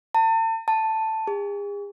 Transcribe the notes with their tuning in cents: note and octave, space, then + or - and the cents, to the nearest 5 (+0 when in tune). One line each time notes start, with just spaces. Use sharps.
A5 +40
A5 +5
G#4 -40